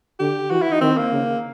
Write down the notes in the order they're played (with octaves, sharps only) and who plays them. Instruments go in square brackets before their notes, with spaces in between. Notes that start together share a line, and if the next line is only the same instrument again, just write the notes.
[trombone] D3 [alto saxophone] G4
[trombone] E3 [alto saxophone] F#4
[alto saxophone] E4
D#4
[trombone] D#3 [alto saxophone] C4
[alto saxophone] A#3
[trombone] C#3